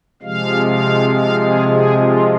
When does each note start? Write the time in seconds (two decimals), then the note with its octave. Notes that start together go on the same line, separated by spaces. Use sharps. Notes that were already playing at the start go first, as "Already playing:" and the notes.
0.22 C3 F3 G#3 F5
0.66 F5
1.10 F5
1.39 G#4
1.68 G#4
1.97 F4